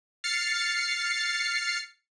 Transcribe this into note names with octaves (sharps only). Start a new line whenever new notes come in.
F6 A6 C7 C#7